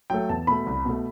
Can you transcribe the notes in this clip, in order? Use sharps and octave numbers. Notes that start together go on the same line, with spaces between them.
F#3 A3 G5
E2 A5
B2 A3 B5
C2
B2 A3